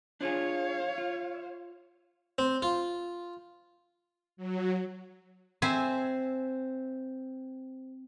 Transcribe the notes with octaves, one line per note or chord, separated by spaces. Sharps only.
D4 F4 G#4 C#5 F5
F4
C4
F4
F#3
C4 C5 E5 G#5